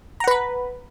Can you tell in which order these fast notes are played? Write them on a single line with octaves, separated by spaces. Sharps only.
A#5 F#5 B4 B5